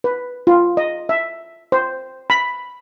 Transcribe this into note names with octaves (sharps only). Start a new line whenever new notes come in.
B4
F4
D#5
E5
C5
B5